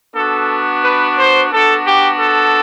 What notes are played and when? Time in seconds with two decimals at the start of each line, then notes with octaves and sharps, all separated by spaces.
0.16 B3 D4 F#4 A4
0.84 B4
1.18 C5
1.52 B3 D4 F#4 A4
1.86 G4
2.20 A4